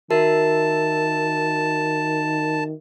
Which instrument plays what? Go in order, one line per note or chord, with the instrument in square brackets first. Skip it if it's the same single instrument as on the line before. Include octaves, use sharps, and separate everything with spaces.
[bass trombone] D#3 [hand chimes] F#4 A#4 E5 [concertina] A5